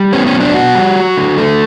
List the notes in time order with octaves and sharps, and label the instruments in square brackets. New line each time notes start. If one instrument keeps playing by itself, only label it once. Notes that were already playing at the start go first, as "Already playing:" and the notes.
Already playing: [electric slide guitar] G3
B3 C#4
C#4
F#3
D4
B3 F#4
G3
F#3
D3
A3